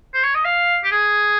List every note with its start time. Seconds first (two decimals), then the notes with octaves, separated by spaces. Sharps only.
0.14 C5
0.24 C#5
0.35 D#5
0.45 F5
0.84 G4
0.92 G#4